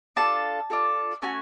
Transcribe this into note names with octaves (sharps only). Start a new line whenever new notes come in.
D4 F4 A4 A5
D4 F4 A4
A3 C#4 F#4 G#5